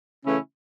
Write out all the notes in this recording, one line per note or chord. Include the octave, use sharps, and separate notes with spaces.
C#3 E3 A3 C#4 E4